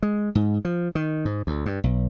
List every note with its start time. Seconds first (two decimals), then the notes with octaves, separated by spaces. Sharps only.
0.03 G#3
0.35 G#2
0.65 F3
0.95 D#3
1.25 G#2
1.47 D2
1.66 G2
1.84 B1